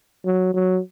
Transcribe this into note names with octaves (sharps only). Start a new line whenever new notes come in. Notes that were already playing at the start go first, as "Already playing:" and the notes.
F#3
F#3